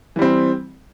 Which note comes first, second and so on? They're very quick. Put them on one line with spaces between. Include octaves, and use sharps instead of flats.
E3 G3 C4